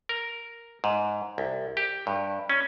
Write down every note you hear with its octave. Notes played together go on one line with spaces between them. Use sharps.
A#4
G#2
C2
G4
G2
C#4